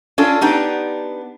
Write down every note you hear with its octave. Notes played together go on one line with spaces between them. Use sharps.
C#4 D4 F4 A4
B3 D4 D#4 G4